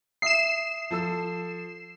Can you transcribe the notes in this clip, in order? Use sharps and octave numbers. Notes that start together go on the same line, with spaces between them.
E5 D#6 C7 E7
F3 A4 E6